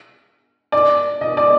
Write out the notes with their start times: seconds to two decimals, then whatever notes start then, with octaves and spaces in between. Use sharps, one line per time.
0.72 D5
1.21 D#5
1.37 D5